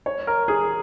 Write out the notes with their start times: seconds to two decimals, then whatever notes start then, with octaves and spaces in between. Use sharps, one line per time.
0.06 C#5
0.27 A#4
0.48 G#4